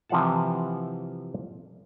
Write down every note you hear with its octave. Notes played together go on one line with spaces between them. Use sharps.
C3 E3 F3 F5 F#5 A5